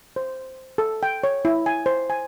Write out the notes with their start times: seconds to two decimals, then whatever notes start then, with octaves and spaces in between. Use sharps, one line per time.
0.16 C5
0.78 A4
1.03 G5
1.24 C#5
1.45 E4
1.66 G#5
1.86 C5
2.10 G#5